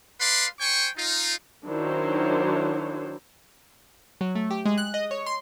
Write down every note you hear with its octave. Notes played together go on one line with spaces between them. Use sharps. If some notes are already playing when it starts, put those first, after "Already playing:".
B4 D5 F5 C6
C5 G5 G#5 C#6
D#4 F4
D#3 F#3 D4 E4 C5 C#5
F#3
A3
G4
G#3
F#6
D#5
C#5
C6